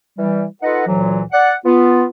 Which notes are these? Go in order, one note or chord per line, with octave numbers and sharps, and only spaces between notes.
E3 G3
D#4 F4 A4 B4 D#5 F#5
D2 A#2 E3 F#3
D5 F#5
B3 F4